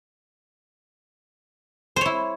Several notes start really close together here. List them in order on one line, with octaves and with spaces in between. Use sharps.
C5 C#5 E4